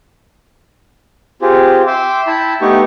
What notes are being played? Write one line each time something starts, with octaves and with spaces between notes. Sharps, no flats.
C4 F4 G4 G#4
E5 G5 C6 D6
E4 E5 G5 A5 B5
A3 B3 D#4 G4 C#6